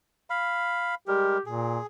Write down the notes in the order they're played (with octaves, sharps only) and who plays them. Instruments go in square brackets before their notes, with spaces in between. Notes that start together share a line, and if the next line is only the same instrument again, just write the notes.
[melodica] F5 B5
[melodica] G3 G#3 A#4 [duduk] G4
[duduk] A#2 [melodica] G#4